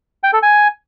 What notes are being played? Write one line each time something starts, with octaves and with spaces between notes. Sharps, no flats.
G5
A4
G#5